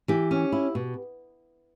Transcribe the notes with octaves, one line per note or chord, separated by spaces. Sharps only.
E3 G4
C#4
E4
B2